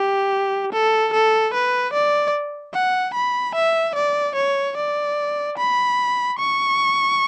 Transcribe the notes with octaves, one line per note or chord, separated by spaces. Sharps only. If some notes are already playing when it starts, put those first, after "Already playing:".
Already playing: G4
A4
A4
B4
D5
F#5
B5
E5
D5
C#5
D5
B5
C#6